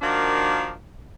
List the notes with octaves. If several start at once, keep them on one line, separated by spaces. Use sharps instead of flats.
D#3 F3 A#3 D4 F#4